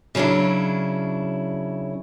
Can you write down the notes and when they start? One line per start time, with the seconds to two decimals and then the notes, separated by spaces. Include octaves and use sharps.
0.15 C#3 F#3 C#4 D4 E4